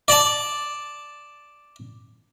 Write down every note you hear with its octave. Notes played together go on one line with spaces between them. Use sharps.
D5 A5